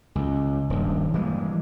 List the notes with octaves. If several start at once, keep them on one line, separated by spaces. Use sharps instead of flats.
C#2
D#1 G2
E3 G3 G#3 A#3